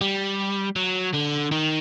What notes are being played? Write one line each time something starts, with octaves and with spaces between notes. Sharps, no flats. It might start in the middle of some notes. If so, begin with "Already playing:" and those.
G3
F#3
D3
D#3